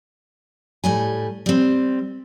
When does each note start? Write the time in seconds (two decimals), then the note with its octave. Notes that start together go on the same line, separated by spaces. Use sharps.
0.84 A2 G3 G#5
1.46 G3 C4